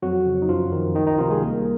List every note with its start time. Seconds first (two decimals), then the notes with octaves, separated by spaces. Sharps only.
0.02 F2 F#3 F#4
0.27 C#3
0.42 D#4
0.49 F#2 F3 F4
0.72 D#3
0.95 C#2 D#3 D#4
1.07 D#3 D#4
1.18 C3 D#3 F3 F4
1.30 G#3 G#4
1.42 C2 A#3 A#4